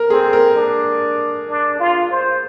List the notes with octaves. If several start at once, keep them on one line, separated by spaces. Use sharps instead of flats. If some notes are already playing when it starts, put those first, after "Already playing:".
Already playing: A#4
C4 G#4
A#4
D4
D4
F4
C5